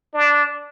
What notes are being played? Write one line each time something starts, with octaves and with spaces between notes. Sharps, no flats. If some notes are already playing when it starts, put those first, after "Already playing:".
D4